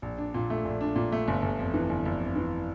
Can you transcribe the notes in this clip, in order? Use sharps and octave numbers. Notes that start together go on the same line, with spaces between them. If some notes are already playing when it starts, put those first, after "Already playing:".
A#1
D4
A#2
A3
A#1
D4
A#2
A3
G1
G1
F2
E3
G1
G1
F2
E3